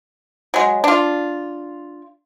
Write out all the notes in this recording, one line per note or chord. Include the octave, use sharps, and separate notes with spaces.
F#3 G#3
D4 F4